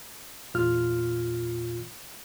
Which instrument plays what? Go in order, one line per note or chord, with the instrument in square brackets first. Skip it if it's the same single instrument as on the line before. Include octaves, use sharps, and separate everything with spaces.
[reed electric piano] E2 A#2 F4 F6